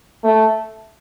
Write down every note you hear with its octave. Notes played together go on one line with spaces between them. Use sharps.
A3